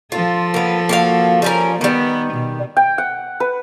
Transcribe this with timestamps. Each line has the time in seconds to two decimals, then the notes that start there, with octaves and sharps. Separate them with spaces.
0.12 F3 F4 A4
0.54 A#3 B3
0.89 A#3 F#4 F5
1.42 G3 C#4 A#4
1.81 D#3 G3 B3
2.33 B2
2.77 G5
2.98 F#5
3.40 B4